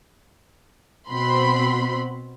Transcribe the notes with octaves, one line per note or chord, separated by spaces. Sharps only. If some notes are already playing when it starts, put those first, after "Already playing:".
B2 C4 F#4 B5 C6